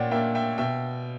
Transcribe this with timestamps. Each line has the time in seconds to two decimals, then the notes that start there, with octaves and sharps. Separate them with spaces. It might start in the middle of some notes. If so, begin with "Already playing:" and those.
Already playing: A#2 C#5 D5 F#5 G5
0.11 A#3 D4 E5 G5
0.35 E5 G5
0.58 B2 E5 G5